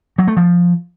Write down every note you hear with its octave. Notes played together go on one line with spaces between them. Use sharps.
F#3
A3
F3